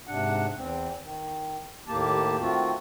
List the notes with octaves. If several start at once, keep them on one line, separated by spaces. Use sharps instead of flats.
G#2 C3 D4 F#5
E2 C4
D#3
D#2 A2 A#3 G4 A5
D#3 A3 C4 F4 F#4